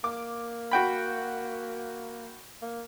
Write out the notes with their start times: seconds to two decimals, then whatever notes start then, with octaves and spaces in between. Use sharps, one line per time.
0.04 A#3 D6
0.71 F#4 G5 B5
2.62 A#3